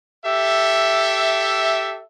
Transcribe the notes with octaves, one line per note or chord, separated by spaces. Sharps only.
G4 A4 E5